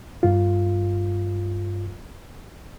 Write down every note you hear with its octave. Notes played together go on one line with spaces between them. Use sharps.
G2 F4